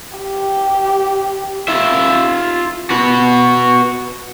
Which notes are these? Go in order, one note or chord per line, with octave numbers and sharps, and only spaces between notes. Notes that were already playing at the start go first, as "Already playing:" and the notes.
G4
F4 E5
F#4 B4